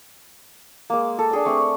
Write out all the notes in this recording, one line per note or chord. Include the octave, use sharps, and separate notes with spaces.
G#3 A#3
A4
D4 G#4 G5
A3 C4 C#6